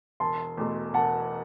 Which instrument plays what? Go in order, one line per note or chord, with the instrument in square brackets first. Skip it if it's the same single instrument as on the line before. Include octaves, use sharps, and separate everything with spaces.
[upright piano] E1 [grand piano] A5 C6
[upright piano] E2 B2 A3
[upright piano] E1 [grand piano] F#5 A5